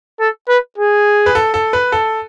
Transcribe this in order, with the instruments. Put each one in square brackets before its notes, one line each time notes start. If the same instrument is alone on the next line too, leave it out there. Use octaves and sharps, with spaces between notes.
[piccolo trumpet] A4
B4
G#4
[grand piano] B4
A4
A4
B4
A4